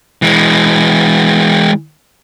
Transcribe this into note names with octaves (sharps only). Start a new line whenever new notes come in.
E3 G#3